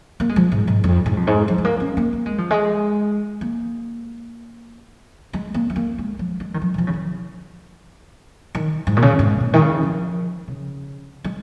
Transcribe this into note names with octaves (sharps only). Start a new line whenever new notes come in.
A#3
G#3
F3
G#2
G#2
F2
G#2
F2
G#2
F3
G#3
A#3
C#4
A#3
A#3
G#3
F3
G#3
A#3
G#3
A#3
G#3
A#3
G#3
F3
G#3
D#3
F3
D#3
F3
C#3
D#3
D#3
G#2
A#2
C#3
G#2
A#2
D#3
C#3
F3
C#3
G#3